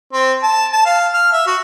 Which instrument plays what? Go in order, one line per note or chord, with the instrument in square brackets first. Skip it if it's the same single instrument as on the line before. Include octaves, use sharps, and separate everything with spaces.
[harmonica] C4
A5
A5
F5
F6
E5
F#4